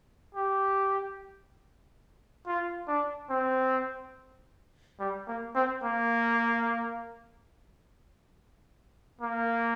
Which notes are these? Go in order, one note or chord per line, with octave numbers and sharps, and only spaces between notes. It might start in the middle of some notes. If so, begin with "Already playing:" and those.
G4
F4
D4
C4
G3
A#3
C4
A#3
A#3